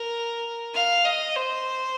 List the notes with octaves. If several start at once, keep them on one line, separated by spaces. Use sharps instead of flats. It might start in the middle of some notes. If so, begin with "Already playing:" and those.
Already playing: A#4
F5
D#5
C5